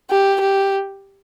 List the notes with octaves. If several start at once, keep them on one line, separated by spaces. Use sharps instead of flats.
G4
G4